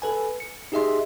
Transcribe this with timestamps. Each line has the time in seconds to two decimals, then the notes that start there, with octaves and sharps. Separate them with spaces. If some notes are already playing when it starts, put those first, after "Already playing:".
0.02 A4 B4 G#5
0.40 C#7
0.72 D#4 G4 G#4 D#5 E5 C6